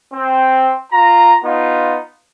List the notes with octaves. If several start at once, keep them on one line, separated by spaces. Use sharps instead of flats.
C4
F4 A#5
B3 D#4 F4